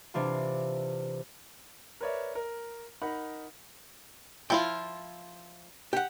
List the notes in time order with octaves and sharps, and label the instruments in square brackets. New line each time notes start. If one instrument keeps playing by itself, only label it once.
[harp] C3 E3 D4 F4
[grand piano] A#4 B4 C#5 D5 E5
A#4
D#4 A#4 F#5 B5
[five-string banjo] F3 E4 F4 [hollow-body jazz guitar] G5
[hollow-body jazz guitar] G4 F#5